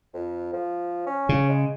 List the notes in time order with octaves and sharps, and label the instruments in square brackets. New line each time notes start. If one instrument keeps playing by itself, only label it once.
[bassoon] F2
F3
C#4
[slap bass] C#3
[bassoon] G#3